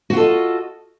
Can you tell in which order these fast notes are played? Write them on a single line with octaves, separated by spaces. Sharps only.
F#4 F4 A4 D#5